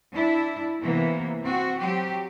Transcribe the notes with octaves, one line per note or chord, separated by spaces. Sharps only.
D4 E4
C3 E3 A#3 B3
C4 F#4
F#3 C4 G4